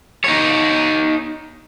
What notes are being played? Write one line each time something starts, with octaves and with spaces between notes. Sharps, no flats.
D#4 C#5